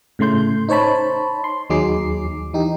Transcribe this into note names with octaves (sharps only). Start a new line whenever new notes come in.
A2 C#3 A3 C6 G6
D#4 C5 C#5 A5 B5
C6
D#2 F#3 D#4 G#4 D6 C7
E3 D#4 G4